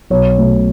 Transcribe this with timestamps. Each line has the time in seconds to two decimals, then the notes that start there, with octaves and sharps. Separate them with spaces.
0.10 B1 C#5
0.38 B2 A3